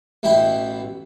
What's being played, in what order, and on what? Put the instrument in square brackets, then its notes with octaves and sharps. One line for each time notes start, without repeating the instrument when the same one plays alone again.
[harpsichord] A1 B2 E4 G5 B5